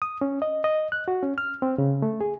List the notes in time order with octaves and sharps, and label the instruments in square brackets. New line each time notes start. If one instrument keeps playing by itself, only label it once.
[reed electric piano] D#6
C#4
D#5
D#5
F#6
F#4
C#4
F6
C4
C#3
A3
G#4